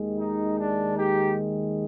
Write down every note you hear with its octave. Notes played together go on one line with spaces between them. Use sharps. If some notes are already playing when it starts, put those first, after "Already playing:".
Already playing: D#2 D#3 G#3
D#4
D4
D#4 G4